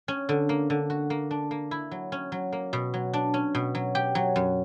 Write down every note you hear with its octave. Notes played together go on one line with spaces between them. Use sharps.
C#4
D3
A#3
D3
F#4
A#3
D4
A#3
E4
F#3
C#4
F#3
A#3
B2
F#3
D4
C#4
B2
F#3
G4
F#3
F#2